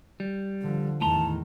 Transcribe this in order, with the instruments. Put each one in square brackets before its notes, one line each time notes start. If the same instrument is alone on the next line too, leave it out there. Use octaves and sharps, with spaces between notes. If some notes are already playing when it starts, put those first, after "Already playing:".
[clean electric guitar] G3
[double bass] D3 F3
[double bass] E2 D#3 [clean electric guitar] A2 A#5 C6 [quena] A5